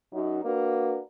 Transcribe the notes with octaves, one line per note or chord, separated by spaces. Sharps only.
F#2 D#4 F#4
A#3 D4 F#4 A#4 B4